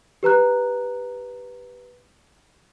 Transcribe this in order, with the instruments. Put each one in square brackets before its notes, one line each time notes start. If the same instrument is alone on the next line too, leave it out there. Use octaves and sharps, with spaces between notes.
[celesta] G4 B4 A#5 F#6